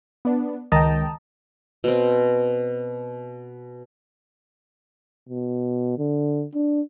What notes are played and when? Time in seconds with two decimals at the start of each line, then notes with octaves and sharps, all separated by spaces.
0.25 B3 D4
0.72 C#2 D#3 D#5 G5 A5 A#5
1.84 B2 C4
5.29 B2
5.99 D3
6.55 D4